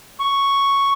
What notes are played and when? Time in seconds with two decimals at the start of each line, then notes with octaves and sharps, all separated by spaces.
0.20 C#6